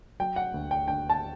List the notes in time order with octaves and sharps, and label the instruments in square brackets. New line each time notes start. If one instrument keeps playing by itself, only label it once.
[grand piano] F#3 G5
F#5
D2
G5
D3 G5
A5